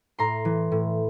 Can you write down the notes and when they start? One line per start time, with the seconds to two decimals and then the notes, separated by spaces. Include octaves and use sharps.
0.19 A2 A#5 C6
0.45 E3
0.72 A2